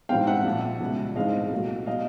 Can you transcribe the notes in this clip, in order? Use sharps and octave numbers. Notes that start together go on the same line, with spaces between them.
G#2 E3 G3 C4 F5 G5
E5 F#5
A#1 A#2 F3
C#2 B2 G3
G#2 E3 G#3 C4 D#5 F5
C2 A#2 F#3 A3
B2 G3 D#5 F5